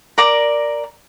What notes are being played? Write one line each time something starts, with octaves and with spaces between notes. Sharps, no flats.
A#4 D5 A#5